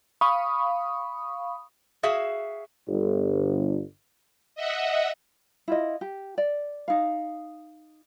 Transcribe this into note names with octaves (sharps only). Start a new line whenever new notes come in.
F5 B5 C#6 D#6
F#4 G#4 E5 F5
G1
D#5 E5 F#5
E4 F4 D#5
G4
D5
D#4 F5